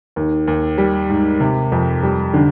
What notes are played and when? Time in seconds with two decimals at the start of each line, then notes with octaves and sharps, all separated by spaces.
0.16 D#2
0.47 D#2
0.78 G3
1.09 G#2
1.40 C3
1.72 F2
2.03 G3
2.34 D3